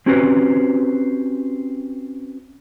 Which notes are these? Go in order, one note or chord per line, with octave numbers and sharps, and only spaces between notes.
C4 C#4 F#4 G4 B4 C5